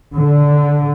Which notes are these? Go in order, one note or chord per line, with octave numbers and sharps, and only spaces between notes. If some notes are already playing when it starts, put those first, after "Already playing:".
D3